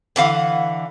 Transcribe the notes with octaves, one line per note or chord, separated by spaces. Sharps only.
D3 E3 F5 F#5